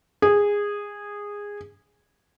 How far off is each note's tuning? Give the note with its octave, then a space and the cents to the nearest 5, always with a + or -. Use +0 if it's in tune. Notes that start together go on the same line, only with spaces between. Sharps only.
G#4 -15